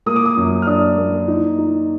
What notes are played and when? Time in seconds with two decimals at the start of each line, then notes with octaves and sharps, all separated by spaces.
0.06 A#3 D#6
0.16 D6
0.26 D#6
0.37 F#2
0.62 F6
0.67 D4 D#6
0.97 A#3
1.28 D#4
1.58 D#4